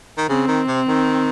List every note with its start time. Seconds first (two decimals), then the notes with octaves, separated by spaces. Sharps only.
0.18 D#3
0.29 C#3 C4
0.48 D#3
0.68 C3
0.88 D#3